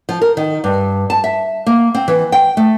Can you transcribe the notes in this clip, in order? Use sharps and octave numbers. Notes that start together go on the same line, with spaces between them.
F3
A#4
D#3
G2
A5
E5
A#3
C4
E3
G5
A3